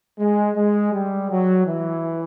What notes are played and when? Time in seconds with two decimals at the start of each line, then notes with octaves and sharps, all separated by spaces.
0.19 G#3
0.56 G#3
0.93 G3
1.30 F#3
1.66 E3